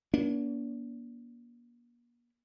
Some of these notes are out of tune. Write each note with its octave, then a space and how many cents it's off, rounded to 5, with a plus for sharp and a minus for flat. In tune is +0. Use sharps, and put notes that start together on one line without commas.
A#3 +40 D4 -40